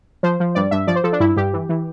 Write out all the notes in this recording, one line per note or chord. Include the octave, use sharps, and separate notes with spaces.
F3 C5
F3
G2 D5
G2 E5
F3 D5
C5
F3 A4
D4
G2 E4
G2 G4
E3
E3